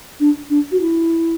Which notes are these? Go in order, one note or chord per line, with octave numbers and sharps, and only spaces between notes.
D4
D4
F#4
E4